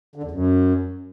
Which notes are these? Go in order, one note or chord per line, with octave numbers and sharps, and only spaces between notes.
D3
E2
F#2